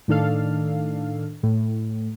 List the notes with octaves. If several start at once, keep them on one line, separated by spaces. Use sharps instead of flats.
A2 D#3 D4 A4 F5
A2